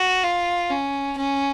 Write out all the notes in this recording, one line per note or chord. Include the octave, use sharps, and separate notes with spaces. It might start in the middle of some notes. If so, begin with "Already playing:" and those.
Already playing: F#4
F4
C#4
C#4